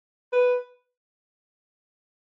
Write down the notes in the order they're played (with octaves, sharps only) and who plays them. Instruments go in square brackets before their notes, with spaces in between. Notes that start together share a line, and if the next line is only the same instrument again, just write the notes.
[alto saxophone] B4